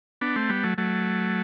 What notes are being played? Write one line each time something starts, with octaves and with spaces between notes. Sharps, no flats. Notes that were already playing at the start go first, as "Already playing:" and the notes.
B3 D4
A3 C4
G3 B3
F#3 A3
F#3 A3